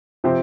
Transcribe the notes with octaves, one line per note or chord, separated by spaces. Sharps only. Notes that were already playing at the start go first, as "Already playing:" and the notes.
C3 F3 C4 G4